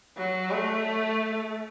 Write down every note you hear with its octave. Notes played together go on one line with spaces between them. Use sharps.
F#3
A3